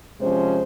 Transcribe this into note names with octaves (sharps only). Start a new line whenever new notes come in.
C3 F3 G#3 C#4 C5